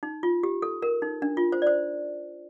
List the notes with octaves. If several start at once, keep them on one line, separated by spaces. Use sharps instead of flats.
D#4
F4
G4
A4
A#4
D#4
D4
F4
C5
D5
C5